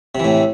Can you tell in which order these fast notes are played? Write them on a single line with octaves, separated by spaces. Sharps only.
C3 E3 A2